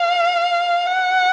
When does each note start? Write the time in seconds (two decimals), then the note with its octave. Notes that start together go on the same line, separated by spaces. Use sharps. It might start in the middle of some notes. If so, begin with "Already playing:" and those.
Already playing: F5
0.86 F#5